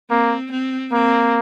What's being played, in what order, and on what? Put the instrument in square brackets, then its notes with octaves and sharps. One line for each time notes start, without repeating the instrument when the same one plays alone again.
[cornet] A#3 [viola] C4
[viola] C4
[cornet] A#3 [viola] C4